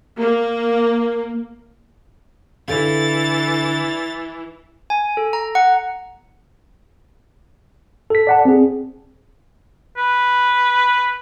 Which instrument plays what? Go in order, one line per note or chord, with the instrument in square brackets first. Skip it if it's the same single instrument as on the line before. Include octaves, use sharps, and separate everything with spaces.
[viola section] A#3
[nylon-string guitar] D3 A4 F5 [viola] E3 [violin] A6
[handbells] G#5
A4
A#5
F#5
[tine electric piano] A4 B6
D5 F#5 A5
C4 G#4
[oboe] B4